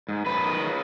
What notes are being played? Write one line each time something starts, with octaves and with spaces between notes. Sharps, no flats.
G#2
F#2 B4
D#3
C#3